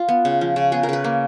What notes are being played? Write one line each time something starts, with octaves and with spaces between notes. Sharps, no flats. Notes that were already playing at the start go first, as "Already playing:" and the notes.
Already playing: F4
B3
C#3
F3
C#3
B3 G#4
A#4
C#3 B4
A#3